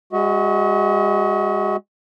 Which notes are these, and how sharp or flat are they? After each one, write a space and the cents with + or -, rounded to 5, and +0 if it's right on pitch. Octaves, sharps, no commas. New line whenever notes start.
G#3 -35 F#4 +0 D#5 +45